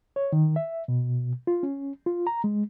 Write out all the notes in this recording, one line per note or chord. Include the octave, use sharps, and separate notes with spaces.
C#5
D#3
E5
B2
F4
C#4
F4
A#5
G#3